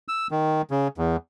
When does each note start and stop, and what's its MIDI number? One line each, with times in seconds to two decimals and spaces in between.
0.08 0.27 88
0.31 0.62 51
0.71 0.88 49
0.98 1.16 40